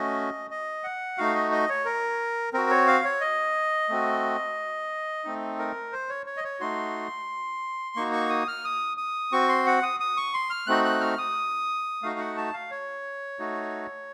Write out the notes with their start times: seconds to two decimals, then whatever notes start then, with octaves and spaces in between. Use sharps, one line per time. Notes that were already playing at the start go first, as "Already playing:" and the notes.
Already playing: A3 C#4 F#4 D#5
0.51 D#5
0.84 F#5
1.18 A3 D#4 F#4 F5
1.35 D#5
1.52 D#5
1.69 C#5
1.85 A#4
2.53 C4 F#4 A#4
2.70 C#5
2.87 F5
3.05 C#5
3.21 D#5
3.89 A3 C4 F#4
5.24 A3 C4 D#4
5.59 A#4
5.93 C5
6.09 C#5
6.26 C#5
6.37 D#5
6.44 C#5
6.60 A3 D#4 F#4 C6
7.96 A#3 D#4 F#4 C#6
8.13 C#6
8.30 D#6
8.48 F6
8.65 D#6
8.97 D#6
9.32 C4 F#4 C#6
9.49 C6
9.66 F#5
9.83 D#6
10.00 D#6
10.17 C#6
10.34 C6
10.50 F6
10.67 A3 C4 D#4 F#4 F#6
10.85 F#6
11.01 F6
11.18 D#6
12.02 A3 D#4 F#4 F5
12.19 F#5
12.37 A5
12.53 F5
12.71 C#5
13.39 A3 D#4 F#4